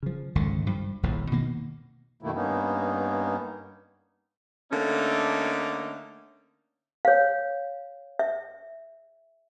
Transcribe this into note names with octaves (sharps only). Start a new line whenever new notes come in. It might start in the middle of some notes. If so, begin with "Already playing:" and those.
C#3 F3
G#1 C#2 D3 D#3
G2 F3
D#1 A#1 E2 A2
B2 D#3 A#3
F#2 B2 D#3 A3 A#3 E4
G2 A#3 B3 C#4 D#4
D3 A3 A#3 C#4 D#4
C#5 F5
E5